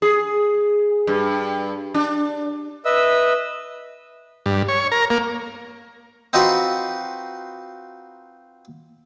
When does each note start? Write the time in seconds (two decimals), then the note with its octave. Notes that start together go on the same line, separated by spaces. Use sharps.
0.02 G#4
1.07 G2
1.94 D4
2.85 B4 D#5 E5 E6
4.46 G2
4.68 C#5
4.92 A#4
5.10 A#3
6.33 C4 D#4 F4 F#4 B4